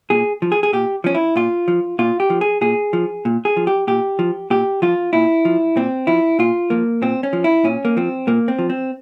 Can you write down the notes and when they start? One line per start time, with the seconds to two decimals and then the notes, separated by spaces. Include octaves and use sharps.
0.10 A#2 G#4
0.42 F3
0.52 G#4
0.63 G#4
0.73 A#2 G4
1.04 F3 C#4
1.15 E4
1.36 A#2 F4
1.68 F3
1.99 A#2 F4
2.20 G4
2.30 F3
2.41 G#4
2.61 A#2 G#4
2.93 F3
3.25 A#2
3.45 G#4
3.57 F3
3.67 G4
3.87 A#2 G4
4.19 F3
4.50 A#2 G4
4.82 F3 F4
5.13 A#2 E4
5.45 F3
5.76 A#2 C4
6.07 F3 E4
6.39 A#2 F4
6.70 F3 A#3
7.02 A#2 C4
7.23 C#4
7.33 F3
7.44 E4
7.64 A#2 C#4
7.85 A#3
7.97 F3 C4
8.27 A#2 A#3
8.48 C4
8.59 F3
8.70 C4